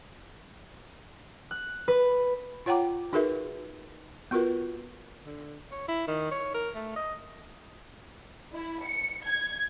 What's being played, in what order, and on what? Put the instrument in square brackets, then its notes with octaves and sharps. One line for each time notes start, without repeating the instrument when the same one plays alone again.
[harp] F#6
B4
[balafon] F4 C#5 F#5 G5 A#5 D6
D#4 F#4 G#4 A#4 B4 E5
B3 F4 F#4 A#4 B4
[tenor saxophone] D3
C#5
E4
D#3
C#5
A#4
A3
D#5
[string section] E4
C#7
G#6